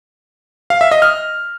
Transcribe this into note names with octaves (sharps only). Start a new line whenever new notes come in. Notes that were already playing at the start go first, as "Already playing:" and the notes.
F5
E5
D#5
F6